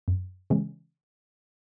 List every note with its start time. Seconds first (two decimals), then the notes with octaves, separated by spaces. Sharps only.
0.08 F#2
0.50 C#3 E3 G#3 C#4